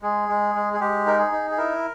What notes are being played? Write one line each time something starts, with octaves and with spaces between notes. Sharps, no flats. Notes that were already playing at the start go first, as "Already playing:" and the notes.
G#3 G#4
G#3
G#3
G#4
G#3 G4
D#4 A#4
G#4
D#4
G#4
E4 A#4